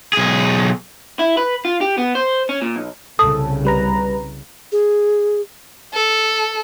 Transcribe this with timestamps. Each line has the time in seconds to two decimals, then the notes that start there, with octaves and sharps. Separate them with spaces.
0.13 B1 G#4
1.19 E4
1.37 B4
1.65 F4
1.81 G4
1.98 B3
2.15 C5
2.49 C#4
2.62 A#2
2.76 B1
3.19 C2 C#3 A4 D#6
3.65 G3 B4 A#5
4.72 G#4
5.94 A4